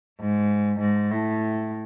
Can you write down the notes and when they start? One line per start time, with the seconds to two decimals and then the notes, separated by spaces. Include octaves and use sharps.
0.20 G#2
0.80 G#2
1.10 A2